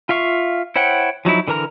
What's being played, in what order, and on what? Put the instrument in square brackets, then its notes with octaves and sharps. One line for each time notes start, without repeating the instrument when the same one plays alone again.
[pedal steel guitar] F4 E5 F5 C#6
E4 C5 C#5 F#5 G5
F3 F#3 D#4 E4
D3 E3 A#4 A#5 F6